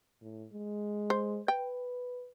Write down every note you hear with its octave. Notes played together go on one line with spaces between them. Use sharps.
A2
G#3
C5
B4 G5